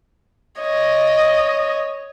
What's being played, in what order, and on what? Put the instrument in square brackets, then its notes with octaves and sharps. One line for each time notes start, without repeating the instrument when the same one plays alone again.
[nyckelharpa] C#5 [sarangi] D#5